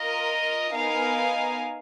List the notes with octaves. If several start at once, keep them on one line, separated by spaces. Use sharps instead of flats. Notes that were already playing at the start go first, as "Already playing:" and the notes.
Already playing: F4 A#4 D#5
B3 D#4 A#4 F5 G#5